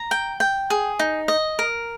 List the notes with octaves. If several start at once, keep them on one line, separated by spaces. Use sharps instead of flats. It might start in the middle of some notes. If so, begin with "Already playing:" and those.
Already playing: A#5
G5
G5
G#4
D#4
D#5
A#4